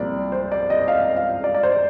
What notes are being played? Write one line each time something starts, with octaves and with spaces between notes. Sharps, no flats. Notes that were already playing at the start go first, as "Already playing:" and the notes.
Already playing: C2 A#2 F3 D5
C5
D5
D#5
F5
F5
D5
D5
C5